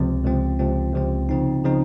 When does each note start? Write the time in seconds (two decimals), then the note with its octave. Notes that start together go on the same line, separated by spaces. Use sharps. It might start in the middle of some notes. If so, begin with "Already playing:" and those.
Already playing: C#2 C3 F3 C4
0.24 C#2 C3 F3 C4
0.59 C#2 C3 F3 C4
0.94 C#2 C3 F3 C4
1.29 C#3 F3 C4 D#4
1.64 C#3 F3 C4 D#4